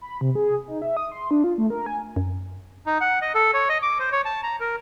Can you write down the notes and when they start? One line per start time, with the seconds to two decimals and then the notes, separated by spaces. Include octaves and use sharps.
0.01 B5
0.21 C3
0.35 G#4
0.68 D#4
0.82 E5
0.97 D#6
1.12 C6
1.31 D4
1.44 F4
1.58 A3
1.70 A#4
1.86 G#5
2.16 F#2
2.86 D#4
3.01 F#5
3.22 D#5
3.35 A4
3.54 C#5
3.69 D#5
3.82 D6
3.99 C5
4.12 C#5
4.25 A5
4.43 A#5
4.60 A#4